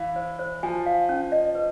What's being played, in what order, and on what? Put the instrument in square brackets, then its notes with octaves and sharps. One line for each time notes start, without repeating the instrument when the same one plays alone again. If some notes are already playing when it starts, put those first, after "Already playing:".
Already playing: [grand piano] E3 [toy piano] F5
[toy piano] C5
C5
[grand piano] F3 [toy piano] G#5
[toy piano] F5
C#4
D#5
B4